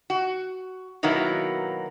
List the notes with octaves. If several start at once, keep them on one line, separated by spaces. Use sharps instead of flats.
F#4
B2 D#3 F#3 A#3 B3 E4